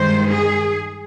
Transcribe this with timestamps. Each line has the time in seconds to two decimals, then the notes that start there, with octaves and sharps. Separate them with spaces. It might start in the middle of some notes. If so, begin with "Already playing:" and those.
Already playing: G2 D#3 G#3 C5
0.30 G#4